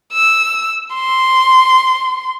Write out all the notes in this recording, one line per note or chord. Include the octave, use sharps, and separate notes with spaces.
E6
C6